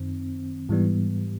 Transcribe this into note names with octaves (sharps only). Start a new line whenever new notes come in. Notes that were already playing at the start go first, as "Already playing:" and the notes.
Already playing: F#2 D#3 C4
G#2 E3 G3 B3